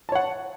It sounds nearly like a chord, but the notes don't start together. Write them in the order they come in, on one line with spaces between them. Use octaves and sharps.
A5 C#5 F#5